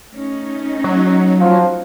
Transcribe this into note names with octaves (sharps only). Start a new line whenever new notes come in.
A3 C#4 D#4
F#3
F3